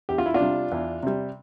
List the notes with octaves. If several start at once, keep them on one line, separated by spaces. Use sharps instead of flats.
E2 G4
F4
E4
D4 F4
C3 G3
E2
C3 G3